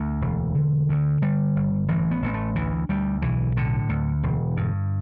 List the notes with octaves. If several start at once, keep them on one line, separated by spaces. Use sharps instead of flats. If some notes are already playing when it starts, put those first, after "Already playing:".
Already playing: D2 A3
E1
D3
D2
D3 G3
G1
A1 E3
B3
A1 B3
A3
D2 E3
D2 G3
B1 E3
A2 D3
D2
E1
G2